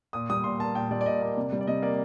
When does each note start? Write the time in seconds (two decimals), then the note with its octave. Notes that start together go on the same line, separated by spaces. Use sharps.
0.13 A#2 D#6
0.30 G3 D#6
0.44 A#2 C6
0.59 A#3 A5
0.75 A#2 G5
0.91 G3 D5
1.01 D5
1.06 A#2 D#5
1.21 A#3 D5
1.37 C3
1.53 G3
1.61 D5
1.67 C3 D#5
1.82 A#3 D5